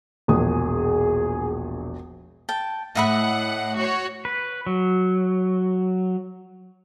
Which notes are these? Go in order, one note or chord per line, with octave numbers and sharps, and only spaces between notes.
E1 A#1 G#4 D#6
G5 A5
A2 D#5 E5 F#5 B5
F#4 C#5
B4
F#3